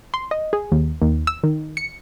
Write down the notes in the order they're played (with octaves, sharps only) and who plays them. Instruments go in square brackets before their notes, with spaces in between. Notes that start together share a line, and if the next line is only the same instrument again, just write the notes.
[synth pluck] C6
D#5
G#4
D#2
D#2
E6
D#3
C#7